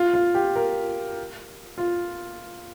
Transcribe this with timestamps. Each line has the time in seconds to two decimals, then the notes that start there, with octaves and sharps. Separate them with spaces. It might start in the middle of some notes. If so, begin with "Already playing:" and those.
Already playing: F4
0.14 F4
0.35 G4
0.56 A#4
1.78 F4